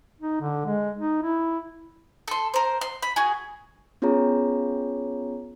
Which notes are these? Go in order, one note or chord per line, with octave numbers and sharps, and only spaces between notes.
D#4
D3
G#3
D#4
E4
A4 C6
A#4 C5
C6
B5
F#4 G#4
B3 C#4 F4 G#4 C#5 A#5